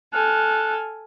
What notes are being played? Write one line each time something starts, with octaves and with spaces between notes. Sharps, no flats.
A4 G#5 F6 F#6